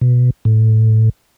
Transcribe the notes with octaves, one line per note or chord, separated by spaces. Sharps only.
B2
A2